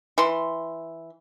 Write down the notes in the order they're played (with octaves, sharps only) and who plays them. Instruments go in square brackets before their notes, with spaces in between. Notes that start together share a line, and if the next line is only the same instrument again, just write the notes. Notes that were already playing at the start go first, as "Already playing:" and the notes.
[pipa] E3 C6